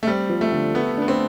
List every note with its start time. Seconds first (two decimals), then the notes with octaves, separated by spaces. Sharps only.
0.03 A3
0.07 G3 C4
0.29 F3
0.41 A3
0.52 D3
0.74 A3 B3
0.97 B3 D4
1.08 C4